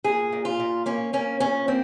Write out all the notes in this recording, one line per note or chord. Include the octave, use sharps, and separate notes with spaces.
A#2 G#4
A#2
F4
A#2
A#3 C#4
A#3 C#4
A#2 C#4
A#3 C4